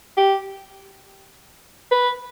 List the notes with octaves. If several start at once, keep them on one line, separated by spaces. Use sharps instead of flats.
G4
B4